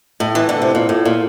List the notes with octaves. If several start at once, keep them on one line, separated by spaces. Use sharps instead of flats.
A2
E3
D3
C3
A#2
A2
A#2